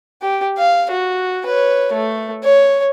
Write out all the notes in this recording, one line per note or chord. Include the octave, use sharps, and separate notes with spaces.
G4
F5
F#4
B4 C#5
A3
C#5